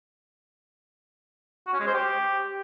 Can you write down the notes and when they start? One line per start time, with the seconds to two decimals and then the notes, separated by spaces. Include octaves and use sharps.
1.66 F#4
1.73 C#4
1.80 G#3
1.87 C5
1.93 G4